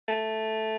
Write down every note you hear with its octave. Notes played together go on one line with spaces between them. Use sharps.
A3